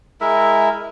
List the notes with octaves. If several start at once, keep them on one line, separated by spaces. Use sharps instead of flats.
G#3 E4 A#4 E5